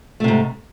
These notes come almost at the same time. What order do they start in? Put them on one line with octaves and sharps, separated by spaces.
A3 C3 G#2